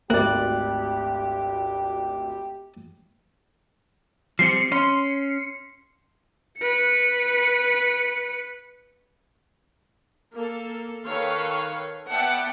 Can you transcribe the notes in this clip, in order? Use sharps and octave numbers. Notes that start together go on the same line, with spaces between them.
G#1 D2 A#3 G4 D5 F#6
F3 G3 C4 C7 C#7
C#4 C6
B4 C#7
A#3 A4
D#3 A4 B4 C#5 F5
B3 D5 E5 F#5 G5 A5